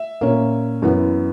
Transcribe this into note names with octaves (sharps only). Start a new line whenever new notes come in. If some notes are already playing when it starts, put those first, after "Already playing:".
Already playing: E5
A#2 A#3 C#4
F#2 E3 B3